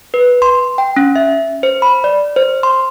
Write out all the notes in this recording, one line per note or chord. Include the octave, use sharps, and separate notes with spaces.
B4
C6
G5
C#4
E5
C5
B5
D5
C5
C6